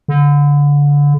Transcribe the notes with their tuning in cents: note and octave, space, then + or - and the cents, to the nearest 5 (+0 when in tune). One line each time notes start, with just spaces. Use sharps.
D3 -25